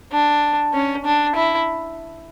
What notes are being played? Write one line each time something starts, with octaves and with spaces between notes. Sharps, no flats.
D4
C#4
D4
E4